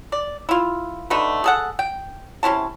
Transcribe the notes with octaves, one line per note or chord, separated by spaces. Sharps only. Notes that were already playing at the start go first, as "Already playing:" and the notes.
D5
E4 F4
D3 A3 D#4 B4
G#4 A4 F#5
G5
C3 C#4 E4 A5